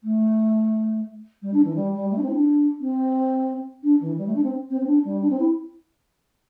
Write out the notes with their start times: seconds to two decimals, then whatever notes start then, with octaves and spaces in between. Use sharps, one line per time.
0.03 A3
1.42 G3
1.53 D4
1.64 E3
1.75 G3
1.93 G3
2.11 A3
2.17 D4
2.22 C4
2.29 E4
2.34 D4
2.80 C4
3.83 D4
4.00 E3
4.18 G3
4.26 A3
4.35 D4
4.43 C4
4.70 C4
4.81 C4
4.87 D4
5.04 G3
5.22 D4
5.30 C4
5.39 E4